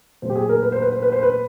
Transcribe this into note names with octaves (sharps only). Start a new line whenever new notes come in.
A#2 F#3 A3 C5
G4
G#4
A#4
B4
C5
B4
C5
B4
C5
B4